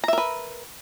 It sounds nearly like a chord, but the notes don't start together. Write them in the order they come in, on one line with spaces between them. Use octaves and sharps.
A#5 E5 A#4 B4